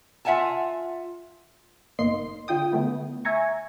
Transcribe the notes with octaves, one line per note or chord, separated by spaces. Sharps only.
F4 E5 F#5 G#5 A5
G1 A#3 D#4 C6 C7
D3 F4 G5 D#6
D3 A3 B3 E4
E5 G#5 A#5 C#6